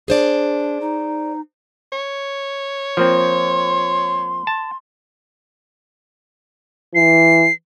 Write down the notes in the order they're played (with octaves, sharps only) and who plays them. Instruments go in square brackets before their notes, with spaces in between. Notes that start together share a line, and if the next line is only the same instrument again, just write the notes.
[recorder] D4 [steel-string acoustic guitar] G#4 C5 D5
[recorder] D#4
[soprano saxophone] C#5
[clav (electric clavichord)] F3 A#3 C4 [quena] C6
[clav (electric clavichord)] A5
[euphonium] E3 [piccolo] C7